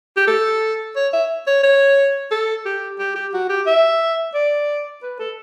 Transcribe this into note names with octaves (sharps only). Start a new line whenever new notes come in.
G4
A4
C#5
E5
C#5
C#5
A4
G4
G4
G4
F#4
G4
E5
D5
B4
A4